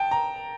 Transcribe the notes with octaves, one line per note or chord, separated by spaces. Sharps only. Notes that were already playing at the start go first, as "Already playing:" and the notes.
Already playing: G5 A5
A#5